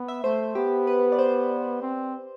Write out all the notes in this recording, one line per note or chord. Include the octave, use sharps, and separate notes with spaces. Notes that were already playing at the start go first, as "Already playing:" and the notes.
Already playing: B3
E5
A3 C5
B3 G4
B4
D5
C5
C4